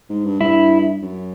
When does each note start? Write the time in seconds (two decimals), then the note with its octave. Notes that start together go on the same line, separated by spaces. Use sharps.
0.10 G#2
0.25 G2
0.40 G2 E4
1.02 F#2